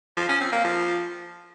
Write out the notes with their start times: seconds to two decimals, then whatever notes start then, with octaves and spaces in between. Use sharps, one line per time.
0.17 F3
0.29 C#4
0.41 C4
0.52 A#3
0.64 F3